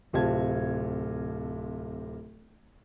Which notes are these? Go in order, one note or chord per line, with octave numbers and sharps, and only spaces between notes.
D1 C3 C4 F4 A5 G#6